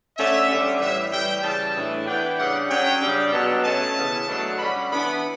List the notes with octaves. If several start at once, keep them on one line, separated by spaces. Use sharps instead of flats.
D3 A3 C#4 E5
D3 G3 C#4
A2 E3 G3 E5
A2 E3 G3 G5
C#3 E3 G3 A5
A2 E3 A3 D4
E3 B3 D4 G5
C#3 G3 D4 F#5
D3 F#3 C#4 G5
C#3 G3 D4
B2 F#3 B3 A5
B2 A3 C#4 A5
C#3 E3 B3
B2 F#3 A3 D4
D3 G3 C#4 B5
E3 B3 D4 B5